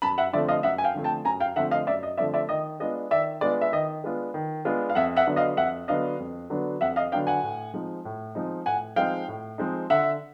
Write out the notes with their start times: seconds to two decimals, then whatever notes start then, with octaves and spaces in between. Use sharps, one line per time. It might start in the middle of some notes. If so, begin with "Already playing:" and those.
0.02 F#2 A5 B5
0.18 E5 F#5
0.33 D3 F3 A3 C4 D5 E5
0.48 D#5 F5
0.63 F#2 E5 F#5
0.78 G#5
0.84 F5 G5
0.94 D3 F3 A3 C4
1.04 G5 A5
1.25 F#2 G#5 A#5
1.40 F5 G5
1.56 D3 F3 A3 C4 E5 F#5
1.71 D#5 F5
1.87 F#2 D5 E5
2.03 D#5
2.17 D3 F3 A3 C4 D5 E5
2.34 D5 E5
2.49 D#3 D#5
2.80 G#3 B3 D4 F4 D#5
3.11 D#3 D5 E5
3.41 G#3 B3 D4 F4 D5
3.61 E5
3.72 D#3 D#5
4.04 G#3 B3 D4 F4
4.34 D#3
4.65 G#3 B3 D4 F4
4.90 F5
4.95 F2 E5 F#5
5.16 E5 F#5
5.27 D3 F#3 B3 D4
5.36 D#5 F5
5.57 F2 E5 F#5
5.88 D3 F#3 B3 D4 D#5 F5
6.19 F2
6.50 D3 F#3 B3 D4
6.81 F2 E5 F#5
6.96 D#5 F5
7.12 D3 F#3 B3 D4 F5 G5
7.27 F#5 G#5
7.43 A2
7.74 F3 G#3 C4 D#4
8.05 A2
8.35 F3 G#3 C4 D#4
8.66 A2 F#5 G#5
8.96 F3 G#3 C4 D#4 F5 G5
9.28 A2
9.58 F3 G#3 C4 D#4
9.90 D3 E5 F#5